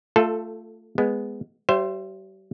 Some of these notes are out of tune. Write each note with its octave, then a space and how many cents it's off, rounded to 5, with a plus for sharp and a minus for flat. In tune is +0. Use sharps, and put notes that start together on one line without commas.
A3 +15 F4 +0 A4 -5
G#3 +0 B3 +5
G3 -40 C5 +0 E5 +30